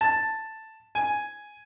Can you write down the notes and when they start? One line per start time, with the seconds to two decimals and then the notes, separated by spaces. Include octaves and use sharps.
0.01 A5
0.95 G#5